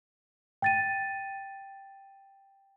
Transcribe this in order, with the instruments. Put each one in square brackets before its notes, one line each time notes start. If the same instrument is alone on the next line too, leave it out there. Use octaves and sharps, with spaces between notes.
[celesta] G5 A6 D#7